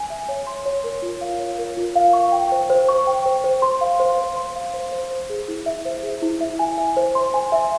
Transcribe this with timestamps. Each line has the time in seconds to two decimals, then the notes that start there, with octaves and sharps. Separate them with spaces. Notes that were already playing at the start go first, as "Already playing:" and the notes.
Already playing: G#5
0.10 E5
0.28 C#5
0.47 C6
0.65 C#5
0.84 A#4
1.02 F4
1.21 F5
1.39 C#5
1.58 A#4
1.77 F4
1.96 F5
2.13 C#6
2.32 G5
2.52 C5
2.70 C5
2.89 C#6
3.07 G5
3.26 C5
3.44 C5
3.62 C6
3.81 F5
4.00 C5
4.18 C5
4.36 C6
4.56 F5
4.74 C5
4.92 C5
5.10 C5
5.30 G#4
5.48 E4
5.66 E5
5.85 C5
6.03 G#4
6.22 E4
6.41 E5
6.59 G#5
6.78 E5
6.97 C5
7.15 C6
7.34 G#5
7.52 E5